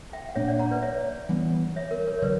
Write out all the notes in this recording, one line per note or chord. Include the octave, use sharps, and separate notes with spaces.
E5 G5
F#5
A#2 A#3 D4 C#5 E5
D5 F#5
F#5 A#5
B4 D5
C#5 E5
E3 G3 B3
C#5 E5
A#4
A#4 C#5
C#5
D3 F#3 B4 D5